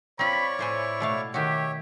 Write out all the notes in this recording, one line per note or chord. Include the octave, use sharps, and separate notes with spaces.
C4 F4 C#5 D5 B5 C#6
A2 E4 C5 G#5
B2 A3 F5
D#3 F#4 G4 C#5 E5